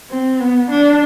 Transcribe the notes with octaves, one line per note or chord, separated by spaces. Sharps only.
C4
B3
D4